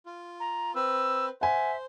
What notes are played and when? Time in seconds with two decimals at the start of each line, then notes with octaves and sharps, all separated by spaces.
0.06 F4
0.40 A#5
0.75 C4 B4 E6
1.41 C5 E5 F#5 G#5